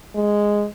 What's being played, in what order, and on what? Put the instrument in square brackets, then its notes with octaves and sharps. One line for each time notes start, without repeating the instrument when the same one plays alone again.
[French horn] G#3